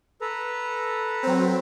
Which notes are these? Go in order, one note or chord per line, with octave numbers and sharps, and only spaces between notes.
A4 B4 A#5
F#3 C4